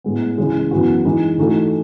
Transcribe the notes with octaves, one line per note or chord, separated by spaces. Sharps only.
A2 G#3 B3
C#2 C#3 E3 G#3
F#2 E3 B3 F#4
E3 G#3 D#4
E3 A3 D#4 F#4 A4